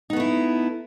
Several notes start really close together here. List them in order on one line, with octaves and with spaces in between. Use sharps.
D#4 B3 A3 E4